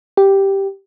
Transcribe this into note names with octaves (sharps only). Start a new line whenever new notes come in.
G4